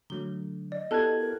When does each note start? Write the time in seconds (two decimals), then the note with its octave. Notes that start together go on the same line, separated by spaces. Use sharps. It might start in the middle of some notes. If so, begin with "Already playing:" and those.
0.10 D3 F#3 A3 G7
0.72 D5 D#5
0.91 B3 E4 F#4 G4 A4 A5 F#6 G#6
1.21 A#4